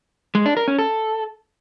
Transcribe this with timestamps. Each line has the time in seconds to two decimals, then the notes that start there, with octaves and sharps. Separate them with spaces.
0.35 G#3
0.46 D4
0.57 A#4
0.68 C#4
0.79 A4